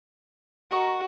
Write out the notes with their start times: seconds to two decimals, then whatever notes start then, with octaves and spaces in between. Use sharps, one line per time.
0.72 F#4 A#4 D#5 C#6